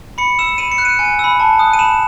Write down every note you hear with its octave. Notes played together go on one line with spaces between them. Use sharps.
B5 C#7
E6 E7
B5 D#7
C#7
F#6
D#7
G#5
B5 E6
A5
D#6 F#6
D#7
B5 E7